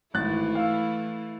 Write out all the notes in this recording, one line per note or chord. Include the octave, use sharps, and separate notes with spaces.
G#1 E3 A3 E4 F#6 A6
F5 E6